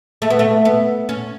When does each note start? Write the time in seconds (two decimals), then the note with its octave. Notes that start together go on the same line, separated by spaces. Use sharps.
0.22 A3
0.30 B3
0.39 A3
0.65 B3
1.09 C#4